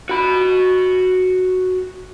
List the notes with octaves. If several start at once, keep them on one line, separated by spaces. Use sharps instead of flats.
F#4 B5